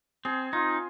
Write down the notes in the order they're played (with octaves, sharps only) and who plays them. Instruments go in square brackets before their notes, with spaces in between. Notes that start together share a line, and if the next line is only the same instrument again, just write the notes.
[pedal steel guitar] C4 [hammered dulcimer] G#4
[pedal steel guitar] D#4 [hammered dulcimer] F4